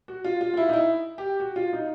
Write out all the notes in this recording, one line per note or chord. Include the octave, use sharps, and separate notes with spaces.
F#4
F4
F4
F4
E4
D#4
E4
G4
F#4
F4
D#4